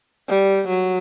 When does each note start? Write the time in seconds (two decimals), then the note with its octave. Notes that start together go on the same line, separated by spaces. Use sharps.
0.29 G3
0.68 F#3